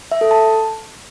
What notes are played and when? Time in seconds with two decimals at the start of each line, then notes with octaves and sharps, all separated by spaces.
0.12 E5
0.21 A4
0.31 A5